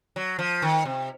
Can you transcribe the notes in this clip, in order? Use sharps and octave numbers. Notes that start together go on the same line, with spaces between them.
F#3
F3
D#3
C3